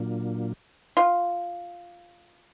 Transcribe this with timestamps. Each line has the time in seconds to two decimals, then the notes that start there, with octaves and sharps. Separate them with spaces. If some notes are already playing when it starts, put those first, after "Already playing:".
Already playing: A#2 F#3 A#3 D4 F4
0.97 F4